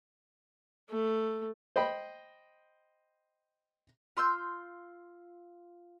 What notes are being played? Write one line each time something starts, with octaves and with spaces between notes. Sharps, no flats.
A3
C5 D#5 G5 B5
F4 C6 E6 G6